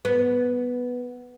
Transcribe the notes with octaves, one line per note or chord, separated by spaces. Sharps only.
B3